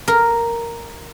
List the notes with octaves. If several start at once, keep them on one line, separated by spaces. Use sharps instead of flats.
A#4